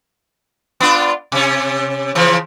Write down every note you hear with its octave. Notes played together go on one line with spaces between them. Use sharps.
B3 D4 F4
C3 C#4
C#3 E3 F3